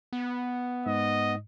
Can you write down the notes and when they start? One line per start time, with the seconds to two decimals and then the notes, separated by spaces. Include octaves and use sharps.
0.13 B3
0.86 G#2 D#5